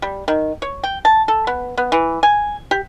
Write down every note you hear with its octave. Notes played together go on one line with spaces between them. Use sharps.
G3
D#3
C#5
G5
A5
A4
B3
B3
E3
G#5
G4